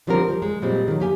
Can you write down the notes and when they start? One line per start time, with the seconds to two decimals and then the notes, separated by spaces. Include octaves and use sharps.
0.07 D3 F3 G3 C4 F4 A#4
0.28 F3 G3
0.42 G#3
0.62 A#2 G3 G#3 C4
0.88 D#3 F#3
1.00 A#3 G4 G#5